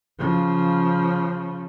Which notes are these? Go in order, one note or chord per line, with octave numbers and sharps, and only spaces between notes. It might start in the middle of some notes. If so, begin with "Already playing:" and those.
C#3 F3